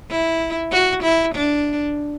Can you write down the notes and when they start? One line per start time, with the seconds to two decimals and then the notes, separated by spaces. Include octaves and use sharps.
0.10 E4
0.72 F#4
1.03 E4
1.34 D4